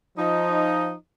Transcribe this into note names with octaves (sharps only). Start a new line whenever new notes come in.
F3 D#4